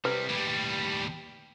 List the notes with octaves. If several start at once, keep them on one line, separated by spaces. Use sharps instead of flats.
C3 G3 B4
D#2 A2 G3